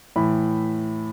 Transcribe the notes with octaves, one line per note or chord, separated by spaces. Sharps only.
A2 E3 B5